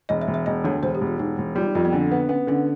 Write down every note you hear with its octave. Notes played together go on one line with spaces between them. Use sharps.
E1 D#5
E5
E1
E5
E1 D#5
D2 C#5
E1 C5
G4
E1
F4
E1 D#4
E1
G3 F4
D#4
F2 F4
B3
D3 C4
B3
B3 C#4
D3 C#4